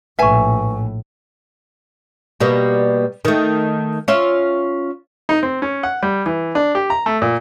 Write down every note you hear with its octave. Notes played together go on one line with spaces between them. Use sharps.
A#1 A2 B4 E5 G#5 C#6
B2 G3 A#3
D#3 A3
C#4 F4 E5
D#4
C4
C#4
F#5
G3
E3
D4
G4
A#5
A3
A#2